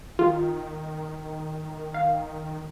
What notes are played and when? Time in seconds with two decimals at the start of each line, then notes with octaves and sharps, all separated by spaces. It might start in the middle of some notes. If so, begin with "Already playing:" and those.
0.19 D#3 F4
1.94 F5